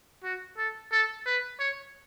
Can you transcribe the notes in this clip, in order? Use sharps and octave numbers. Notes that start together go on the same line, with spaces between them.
F#4
A4
A4
B4
C#5